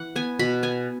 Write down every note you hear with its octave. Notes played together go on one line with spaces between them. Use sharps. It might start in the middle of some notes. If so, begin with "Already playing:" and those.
Already playing: E3 F#5
B3 G#5
B2 B5
B3 G#5